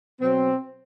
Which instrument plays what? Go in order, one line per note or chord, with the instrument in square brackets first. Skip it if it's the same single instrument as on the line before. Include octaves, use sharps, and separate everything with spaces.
[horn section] B2 F#3 C4